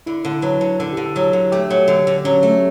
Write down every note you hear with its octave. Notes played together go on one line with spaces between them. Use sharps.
D3 E4
D3
F#3 B4
D3
D3 A4
D3 G4
A4
F#3
D3
A3 G4
F#3
D3
D3
F#3 C#4
A3